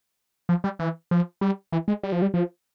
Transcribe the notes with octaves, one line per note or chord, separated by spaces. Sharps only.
F3
G3
E3
F3
G3
E3
G#3
G3
F3
G3
F3